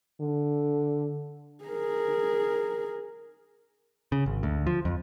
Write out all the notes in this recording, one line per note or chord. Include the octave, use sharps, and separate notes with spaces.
D3
G#4 A#4
C#3
G#1
D2
F3
F2